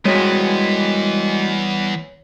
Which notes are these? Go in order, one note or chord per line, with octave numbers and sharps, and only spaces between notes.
E3 G3 G#3 B3 F#4 C#5 B6